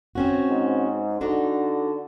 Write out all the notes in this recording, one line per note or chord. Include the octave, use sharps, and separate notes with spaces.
C4 C#4 F#4
G#2
D3 D4 D#4 F#4